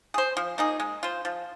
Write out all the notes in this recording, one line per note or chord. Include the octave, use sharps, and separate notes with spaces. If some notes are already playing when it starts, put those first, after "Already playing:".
G#4 C5
F3
A#3 D#4 G#4
G#3
F4 C5
F3